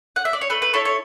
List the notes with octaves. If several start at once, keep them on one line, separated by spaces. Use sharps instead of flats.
F#5
E5
D5
C#5
A3 B4
B4
E4 A4 C#5
C#5